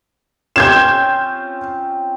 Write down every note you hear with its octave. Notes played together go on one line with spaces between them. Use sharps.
C4 C#4 F4 G6 G#6 E7